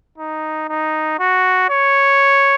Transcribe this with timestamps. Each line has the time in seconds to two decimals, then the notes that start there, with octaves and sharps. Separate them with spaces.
0.18 D#4
0.68 D#4
1.19 F#4
1.69 C#5